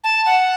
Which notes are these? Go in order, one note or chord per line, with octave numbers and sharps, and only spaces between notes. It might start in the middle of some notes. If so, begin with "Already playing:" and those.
A5
F#5